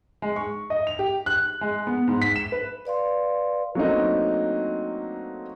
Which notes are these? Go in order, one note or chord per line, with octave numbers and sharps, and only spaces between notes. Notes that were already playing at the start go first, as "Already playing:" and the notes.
G#3
C#6
D#5
F7
G4
F#6
G#3
B3
G#2
B6
E7
B4
B4 D5 F5 C6
F#3 A3 A#3 C4 D4 D#4